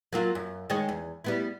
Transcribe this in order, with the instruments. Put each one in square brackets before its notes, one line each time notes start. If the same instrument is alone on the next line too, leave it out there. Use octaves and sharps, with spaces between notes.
[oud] F#3 A#3 F4
F#2
D#3 G#3 C#5
E2
G3 B3 E4